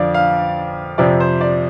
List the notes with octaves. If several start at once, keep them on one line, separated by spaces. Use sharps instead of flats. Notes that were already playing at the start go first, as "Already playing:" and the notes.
Already playing: F2 D3 F3 D5 F5
F5
F2 C3 F3 D5
C5
D5